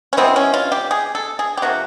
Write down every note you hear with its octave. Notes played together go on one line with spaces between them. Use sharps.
C#4
C3 E3 G#3 B3 C4
C#4
F4
G4
G#4
A4
G#4
G4
C3 F3 A#3 F#4